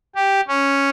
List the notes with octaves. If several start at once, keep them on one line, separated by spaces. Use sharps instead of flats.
G4
C#4